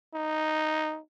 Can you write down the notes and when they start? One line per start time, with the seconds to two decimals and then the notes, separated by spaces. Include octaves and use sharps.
0.15 D#4